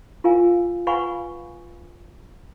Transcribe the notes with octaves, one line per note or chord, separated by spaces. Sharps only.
F4 A#4 F5 G#5
B4 F5 F#5 G#5 B5 C#6